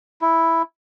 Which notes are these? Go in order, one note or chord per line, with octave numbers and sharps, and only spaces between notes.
E4